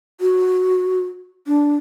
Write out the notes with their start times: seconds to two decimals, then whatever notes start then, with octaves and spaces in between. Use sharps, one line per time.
0.21 F#4
1.47 D4